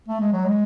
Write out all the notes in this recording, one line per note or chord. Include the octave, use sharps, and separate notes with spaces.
A3
G#3
F#3
G#3